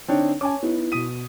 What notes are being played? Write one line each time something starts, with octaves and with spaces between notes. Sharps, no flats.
D3 C4 D4 D#4 C#5 G5
C#4 C#5 G#5 A5 D6
B3 D#4 E4
B2 D#6 B6 D#7